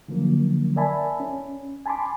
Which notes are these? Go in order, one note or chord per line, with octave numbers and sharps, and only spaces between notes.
D3 F3 F#3 A#3
A#4 D5 E5 G#5 A5 B5
C#4
G#5 A5 B5 C6 D6